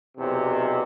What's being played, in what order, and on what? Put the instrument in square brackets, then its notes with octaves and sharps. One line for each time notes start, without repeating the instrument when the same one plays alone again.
[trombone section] B1 E2 C3